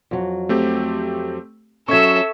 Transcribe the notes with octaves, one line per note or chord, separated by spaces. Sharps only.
F2 F#3
A3 C4 G4
F#3 C#4 A4 E5 C#6 G#6